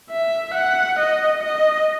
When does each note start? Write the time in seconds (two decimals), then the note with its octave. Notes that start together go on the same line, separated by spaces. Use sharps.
0.11 E5
0.54 F#5
0.99 D#5
1.43 D#5